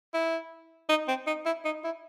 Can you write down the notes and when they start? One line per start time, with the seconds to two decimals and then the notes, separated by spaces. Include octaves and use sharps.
0.14 E4
0.89 D#4
1.08 C4
1.27 D#4
1.46 E4
1.65 D#4
1.84 E4